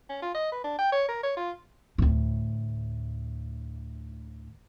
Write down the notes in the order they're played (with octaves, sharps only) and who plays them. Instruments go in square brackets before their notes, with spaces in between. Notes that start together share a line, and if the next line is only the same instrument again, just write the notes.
[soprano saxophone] C#4
F4
D#5
B4
D4
G5
C#5
A#4
C#5
F4
[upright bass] D2 A2